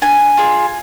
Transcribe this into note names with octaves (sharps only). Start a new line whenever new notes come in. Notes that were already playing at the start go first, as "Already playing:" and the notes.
D4 G#5
F4 G#4